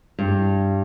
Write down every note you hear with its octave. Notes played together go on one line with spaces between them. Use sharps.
G2